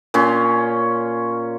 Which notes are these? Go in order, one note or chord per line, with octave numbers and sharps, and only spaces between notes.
A#2 C#4 C6